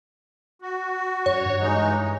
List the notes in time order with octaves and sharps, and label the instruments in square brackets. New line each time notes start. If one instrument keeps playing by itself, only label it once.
[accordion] F#4
[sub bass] F#2 [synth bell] C#5
[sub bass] G2
[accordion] E3 G#3 D#4